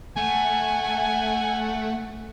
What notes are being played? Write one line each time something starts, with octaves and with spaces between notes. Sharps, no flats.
A3 F#5 G#5